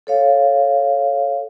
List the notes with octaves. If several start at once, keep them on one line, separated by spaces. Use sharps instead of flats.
A4 C#5 F5